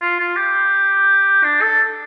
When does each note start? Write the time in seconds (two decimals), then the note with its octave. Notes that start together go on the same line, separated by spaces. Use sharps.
0.01 F4
0.19 F4
0.36 G4
1.43 D4
1.62 A4